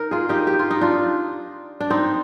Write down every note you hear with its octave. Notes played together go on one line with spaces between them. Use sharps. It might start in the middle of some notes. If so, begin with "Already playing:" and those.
Already playing: D#4 A#4
F4 G#4
D#4 G4
G4
F4
D#4
D4 F4
D4
C4 D#4